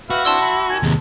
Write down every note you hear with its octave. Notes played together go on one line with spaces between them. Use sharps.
F#4 B4 E5 F5
C4 D4 E4 A5 C6 E6
E5 B5
D#3 G#5
D#2 C3 G#3